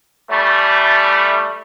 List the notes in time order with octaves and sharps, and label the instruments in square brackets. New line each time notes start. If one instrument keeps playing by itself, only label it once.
[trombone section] E3 G3 A3